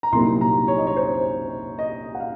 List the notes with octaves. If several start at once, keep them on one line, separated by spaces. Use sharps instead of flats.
A#5
C2 A#2 F#3 A#3 D#4 C6
A#5
C#5
D#5
C#5
C5
D#5
F#5
F5